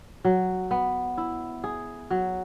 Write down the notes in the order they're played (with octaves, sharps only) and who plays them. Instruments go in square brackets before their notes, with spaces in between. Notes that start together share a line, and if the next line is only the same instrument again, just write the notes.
[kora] F#3
B3
E4
G#4
F#3